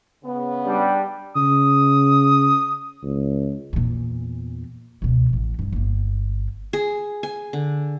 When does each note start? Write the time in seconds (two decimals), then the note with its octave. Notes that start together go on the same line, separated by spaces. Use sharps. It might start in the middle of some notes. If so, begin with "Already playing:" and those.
0.23 C#3 B3
0.66 G3 D4
1.36 C#3 D#6
3.03 C#2
3.73 E2 A#2
5.02 C#2 B2
5.29 A1 E3
5.59 G#1 G2
5.73 G1 A#3
6.73 G#4
7.23 G#5
7.53 D3